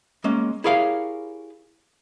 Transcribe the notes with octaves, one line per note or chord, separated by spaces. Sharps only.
G#3 A#3 C#4
E4 G4 G#4 A#4 C#5 F5